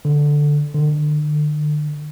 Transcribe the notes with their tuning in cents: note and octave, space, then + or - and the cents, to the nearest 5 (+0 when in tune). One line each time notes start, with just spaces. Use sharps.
D3 +0
D3 +35